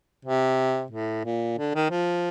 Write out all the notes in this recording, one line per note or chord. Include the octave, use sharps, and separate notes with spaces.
C3
A2
A#2
D3
D#3
F3